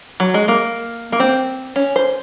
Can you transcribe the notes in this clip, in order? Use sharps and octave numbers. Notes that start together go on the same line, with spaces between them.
F#3
G#3
A#3
A#3
C4
C#4
C5